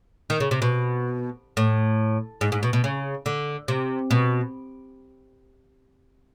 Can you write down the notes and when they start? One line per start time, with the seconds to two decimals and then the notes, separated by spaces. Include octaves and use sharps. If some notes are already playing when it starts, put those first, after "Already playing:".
0.30 D#3
0.40 C#3
0.51 C3
0.62 B2
1.57 A2
2.41 G#2
2.52 G#2
2.63 B2
2.73 B2
2.84 C#3
3.26 D3
3.68 C3
4.11 B2